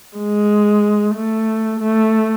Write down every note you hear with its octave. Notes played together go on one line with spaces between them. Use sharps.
G#3
A3
A3